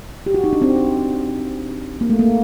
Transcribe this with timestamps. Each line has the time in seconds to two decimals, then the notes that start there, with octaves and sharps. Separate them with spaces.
0.26 G4
0.34 F#4
0.44 D#4
0.53 D4
0.62 C4
2.01 A#3
2.10 A3
2.19 A#3